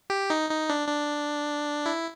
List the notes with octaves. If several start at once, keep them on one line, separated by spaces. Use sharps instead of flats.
G4
D#4
D#4
D4
D4
E4